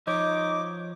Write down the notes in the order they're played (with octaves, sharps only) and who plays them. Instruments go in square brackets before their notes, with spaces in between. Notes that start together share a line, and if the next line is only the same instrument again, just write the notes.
[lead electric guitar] F3 C#5 [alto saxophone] D#4 [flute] D6